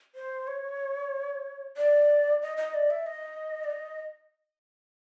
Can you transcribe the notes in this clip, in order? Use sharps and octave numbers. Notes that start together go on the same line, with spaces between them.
C5
C#5
D5
D#5
D#5
D5
E5
D#5
D5
D#5